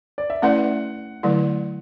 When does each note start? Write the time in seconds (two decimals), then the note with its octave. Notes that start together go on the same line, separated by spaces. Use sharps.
0.18 D5
0.30 E5
0.42 A3 C#4 E4 B4 D5 F#5
1.23 D3 F#3 A3 E4